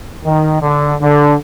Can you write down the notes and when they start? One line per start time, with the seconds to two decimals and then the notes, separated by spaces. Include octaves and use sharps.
0.24 D#3
0.61 D3
1.00 D3